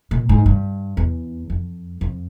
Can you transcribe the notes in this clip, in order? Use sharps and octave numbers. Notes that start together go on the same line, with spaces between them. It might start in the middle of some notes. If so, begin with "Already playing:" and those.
A#2
G#2
G2
E2
F2
F2